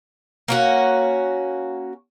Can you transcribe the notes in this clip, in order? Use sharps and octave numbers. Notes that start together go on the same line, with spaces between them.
A#3 C#4 F#4